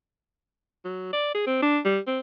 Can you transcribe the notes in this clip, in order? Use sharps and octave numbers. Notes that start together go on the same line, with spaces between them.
F#3
D5
G#4
C4
D4
G3
C4